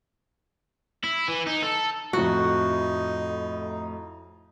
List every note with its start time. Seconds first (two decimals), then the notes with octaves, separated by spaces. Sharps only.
1.04 E4
1.28 E3
1.47 D#4
1.62 A4
2.13 F2 A2 F3 D#4 F#4